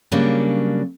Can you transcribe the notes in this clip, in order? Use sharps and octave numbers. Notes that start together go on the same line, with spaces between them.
C#3 F#3 G3 A#3 C#4 D4